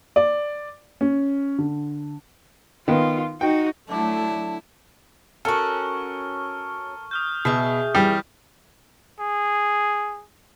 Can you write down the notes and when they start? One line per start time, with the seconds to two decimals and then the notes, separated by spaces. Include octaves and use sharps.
0.16 D5
1.01 C#4
1.59 D3
2.88 D#3 B3 F4
3.41 D#4 F#4 G5
3.89 D3 F#3 A3 D4 E4 A5
5.45 C#4 F#4 A4 A#4 C#6 F6
7.11 D#6 F6 G6
7.45 B2 G#4 E5
7.95 E3 G3
9.20 G#4